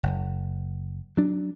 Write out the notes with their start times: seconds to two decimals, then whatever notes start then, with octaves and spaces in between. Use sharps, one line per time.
0.03 F#1
1.17 F#3 D4